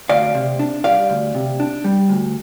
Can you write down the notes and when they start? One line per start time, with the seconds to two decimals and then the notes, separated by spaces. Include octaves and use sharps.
0.09 D2 D5 F5
0.35 C3
0.59 D4
0.84 G3 D5 F5
1.10 D2
1.35 C3
1.60 D4
1.84 G3
2.09 D2